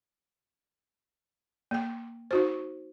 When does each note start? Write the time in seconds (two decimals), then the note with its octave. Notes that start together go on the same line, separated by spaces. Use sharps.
1.71 A#3 G5
2.31 D#4 F#4 C5